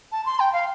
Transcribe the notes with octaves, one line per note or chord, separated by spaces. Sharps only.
A5
C6
G5
F5